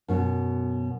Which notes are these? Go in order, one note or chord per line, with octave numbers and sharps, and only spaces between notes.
F#2 B2